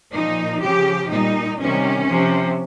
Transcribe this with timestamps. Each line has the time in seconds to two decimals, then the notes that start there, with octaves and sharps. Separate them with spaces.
0.13 A#2 F3 D#4
0.61 C#3 F3 G4
1.10 A#2 G3 D#4
1.58 C3 D#3 G3 C#4
2.07 C3 F3